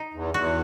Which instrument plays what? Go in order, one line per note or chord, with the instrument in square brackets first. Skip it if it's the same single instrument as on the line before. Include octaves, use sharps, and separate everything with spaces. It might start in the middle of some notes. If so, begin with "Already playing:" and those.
Already playing: [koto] D#4
[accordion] E2
[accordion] E2 [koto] F#4